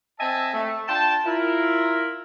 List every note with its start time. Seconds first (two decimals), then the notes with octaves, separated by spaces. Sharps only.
0.19 C4 D#5 E5 G#5 A5
0.53 A3
0.88 D4 F4 G5 A5
1.25 E4 F4 A#4